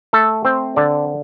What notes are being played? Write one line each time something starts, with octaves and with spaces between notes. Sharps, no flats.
A3 A4
C4 C5
D3 D5